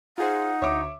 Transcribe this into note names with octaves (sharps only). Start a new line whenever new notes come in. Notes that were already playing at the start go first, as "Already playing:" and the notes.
D#4 F4 G#4 C5 F#5
D2 C#5 E5 D6